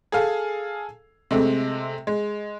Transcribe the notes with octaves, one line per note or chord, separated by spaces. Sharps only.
G#4 A4 F5
C3 G#3 A3 C4
G#3